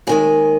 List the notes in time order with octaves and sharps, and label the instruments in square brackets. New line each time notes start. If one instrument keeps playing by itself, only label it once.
[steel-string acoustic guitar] D#2 D#3 G#3 G#5